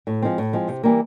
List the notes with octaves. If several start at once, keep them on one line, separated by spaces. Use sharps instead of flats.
A2
F3 G#3 C4
A2
F3 G#3 C4
C3
E3 G3 A#3